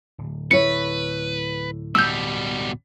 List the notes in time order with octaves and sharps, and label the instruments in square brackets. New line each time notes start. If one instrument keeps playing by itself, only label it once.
[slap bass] D1
[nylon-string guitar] E4 A4 C#5 [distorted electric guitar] B4 [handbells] C#7
[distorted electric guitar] B2 G3 [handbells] E6 G6